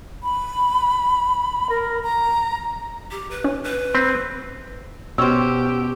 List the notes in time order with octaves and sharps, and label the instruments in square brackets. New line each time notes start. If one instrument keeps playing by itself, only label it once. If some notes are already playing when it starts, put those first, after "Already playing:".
[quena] B5
A#4
A#5
[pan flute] G4
B4
[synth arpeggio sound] C#4
[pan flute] B4
[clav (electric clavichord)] C4 [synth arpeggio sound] B5
[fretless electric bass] B2 [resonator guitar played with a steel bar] C#4 C5 [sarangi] G4 [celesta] E6